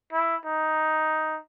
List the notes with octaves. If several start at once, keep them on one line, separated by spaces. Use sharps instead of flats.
E4
D#4